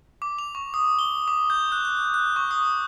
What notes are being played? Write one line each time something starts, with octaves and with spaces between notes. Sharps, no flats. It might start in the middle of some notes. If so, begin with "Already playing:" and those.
D6
F7
C#6
D#6
G7
D6
G6
F#6
F#6
F#6
C#6
D#6